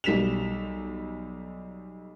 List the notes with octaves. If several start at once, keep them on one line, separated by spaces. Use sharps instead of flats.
B1 G3 B6 E7 F7